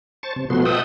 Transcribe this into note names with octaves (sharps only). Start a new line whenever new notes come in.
C5 A5 C#6 A6
C3
B2 F3 A3 B3 F#4 C6
D#5 E5 F#5 G5 A5 D#6